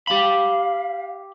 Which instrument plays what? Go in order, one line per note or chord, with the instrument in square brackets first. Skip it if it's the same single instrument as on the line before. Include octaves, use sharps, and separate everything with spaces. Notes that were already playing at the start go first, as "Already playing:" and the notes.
[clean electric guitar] G4 B5 [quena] F5